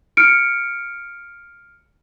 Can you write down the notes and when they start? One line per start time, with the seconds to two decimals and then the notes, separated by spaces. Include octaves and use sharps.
0.17 F6 C#7 D7